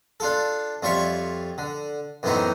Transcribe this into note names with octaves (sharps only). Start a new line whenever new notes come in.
D4 F4 A4
F2 G3 F4 C#5 E5 C#6
D3
F#2 A2 E3 B3 C4 D#4